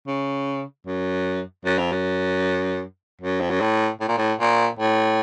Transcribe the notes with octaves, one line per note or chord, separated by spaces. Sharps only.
C#3
F#2
F#2
F2
F#2
F#2
F2
F#2
A2
A2
A#2
A2
A#2
A2